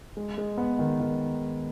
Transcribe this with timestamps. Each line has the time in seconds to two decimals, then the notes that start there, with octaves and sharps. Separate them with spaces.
0.17 G#3
0.38 G#3
0.58 B3
0.79 D#3
1.00 D#3